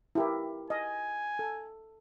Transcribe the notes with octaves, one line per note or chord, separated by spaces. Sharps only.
E4 G4 A#4
D#5 G#5
A4